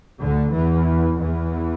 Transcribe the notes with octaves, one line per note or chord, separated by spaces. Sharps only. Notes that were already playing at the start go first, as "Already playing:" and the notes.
D2 D3
E2 E3
E2 E3